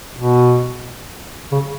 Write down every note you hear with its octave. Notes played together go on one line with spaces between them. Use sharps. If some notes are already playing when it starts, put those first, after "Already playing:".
B2
C#3